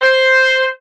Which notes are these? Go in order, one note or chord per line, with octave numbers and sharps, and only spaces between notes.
C5